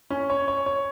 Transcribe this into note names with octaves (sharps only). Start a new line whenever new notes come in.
C#4
C#5
C#5
C#5